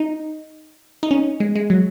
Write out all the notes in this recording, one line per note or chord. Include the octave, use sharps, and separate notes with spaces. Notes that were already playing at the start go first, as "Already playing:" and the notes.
Already playing: D#4
D#4
C#4
G#3
G#3
F#3